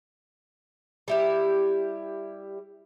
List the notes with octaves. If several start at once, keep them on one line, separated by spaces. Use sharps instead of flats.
G3 E4 G4